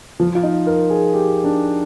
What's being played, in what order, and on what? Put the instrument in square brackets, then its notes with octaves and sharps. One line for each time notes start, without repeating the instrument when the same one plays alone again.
[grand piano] F3
F4
D#4
A#4
G#4
G4
D4